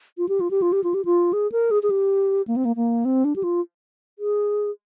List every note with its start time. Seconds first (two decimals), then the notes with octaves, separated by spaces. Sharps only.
0.18 F4
0.29 G4
0.40 F4
0.51 G4
0.62 F4
0.72 G4
0.84 F4
0.94 G4
1.05 F4
1.33 G#4
1.52 A#4
1.71 G#4
1.83 G#4
1.90 G4
2.48 A#3
2.56 C4
2.65 A#3
2.76 A#3
3.05 C4
3.25 D4
3.36 G4
3.44 F4
4.19 G#4